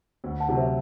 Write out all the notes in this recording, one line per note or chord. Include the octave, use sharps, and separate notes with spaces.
D2
F#5 A5
C3 F#3
C5 E5